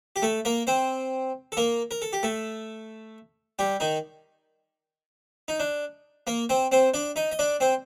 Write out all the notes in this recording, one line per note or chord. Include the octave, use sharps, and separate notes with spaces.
G4
A3 A4
A#3 A#4
C4 C5
A4
A#3 A#4
A#4
A4
G4
A3 A4
G3 G4
D#3 D#4
D#4
D4
A#3 A#4
C4 C5
C4 C5
D4 D5
D#4 D#5
D#5
D4 D5
C4 C5